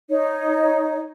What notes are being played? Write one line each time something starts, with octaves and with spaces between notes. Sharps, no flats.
D#4 C#5